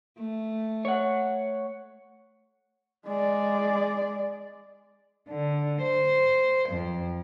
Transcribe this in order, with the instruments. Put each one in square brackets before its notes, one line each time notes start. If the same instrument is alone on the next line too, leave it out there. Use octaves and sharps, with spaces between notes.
[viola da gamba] A3
[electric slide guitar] C#5 F#5
[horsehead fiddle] G#3 D5
[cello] D3
C5
F2